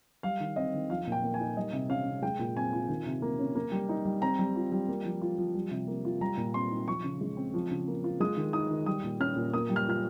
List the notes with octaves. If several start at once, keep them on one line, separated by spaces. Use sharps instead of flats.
G3 F5
D#3
C4 D#5
D#3
F3 F5
A#2 G5
A#3
G#5
D#4
G3 D#5
C3
C#4 F5
C3
G#3 G5
A#2
C4 G#5
F4
D#3
C3
A#3
C#4
A#3
G3
D#4
G3
C4 A#5
G3
F4
G3
A#3
F3
F4
F3
G3
C3
A#3
F4
G3 A#5
A#2
C4 C6
D#4
F3 C#6
C#3
G#3
C4
F3
C#3
A#3
F4
G#3 D#6
D#3
D#4 D#6
D#3
G3 D#6
A#2
C#4 F6
A#2
A#3 D#6
G3
F6
F4 F6